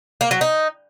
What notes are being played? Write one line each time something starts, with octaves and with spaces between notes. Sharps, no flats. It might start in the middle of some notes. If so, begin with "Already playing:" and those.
A#3
F#3
D#4